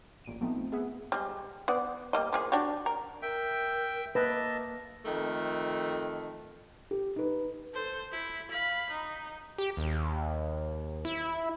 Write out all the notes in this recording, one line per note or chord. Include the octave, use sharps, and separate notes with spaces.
A1 A#2 D7 D#7
F3 A3 B3 C4 D#4
B3 G#4 E5 F#5
G3 G#3
B3 D5 F#5
G3 A#3 D#5
F3 A#3 G#4
D4 F#4 G4
A#4
A#4 E5 G5
A#3 B4 D#5 E5 A5
F2 D#3 A3
G4
D#4 B4
A4 C5
E4
F5 B5
D#4
G4
D#2
E4